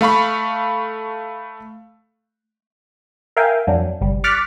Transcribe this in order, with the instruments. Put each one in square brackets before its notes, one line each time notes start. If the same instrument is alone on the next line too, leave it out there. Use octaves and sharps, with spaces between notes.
[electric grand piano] A3 F5 B5 C#6
[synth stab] A#4 E5 F5 G5 G#5
F2 F#3 D4
G1 C2 G3
C#6 D6 F6 F#6 A6 B6